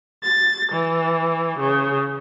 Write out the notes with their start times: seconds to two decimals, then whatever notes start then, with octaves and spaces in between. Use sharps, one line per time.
0.24 A6
0.73 E3
1.60 C#3